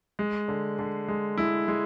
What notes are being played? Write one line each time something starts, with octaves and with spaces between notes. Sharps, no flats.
G#3
D3
D3
G#3
G#3 E4
G#3